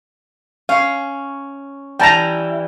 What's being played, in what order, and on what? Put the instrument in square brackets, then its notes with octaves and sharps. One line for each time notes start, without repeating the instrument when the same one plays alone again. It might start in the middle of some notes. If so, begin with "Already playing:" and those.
[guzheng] C#4 C#5 [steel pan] F5
[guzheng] E3 G3 [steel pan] G5 A5 A#5